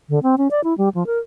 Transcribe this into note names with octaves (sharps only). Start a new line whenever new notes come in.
D3
C4
C#4
D5
E4
G3
F3
A#4